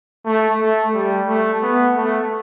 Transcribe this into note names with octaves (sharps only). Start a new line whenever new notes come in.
A3
A3
G3
A3
B3
A3